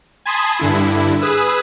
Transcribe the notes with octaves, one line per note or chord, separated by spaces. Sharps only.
G#5 A5 B5 C6 D#6 G#6
G2 D3 E4
G#4 B4 D#6 E6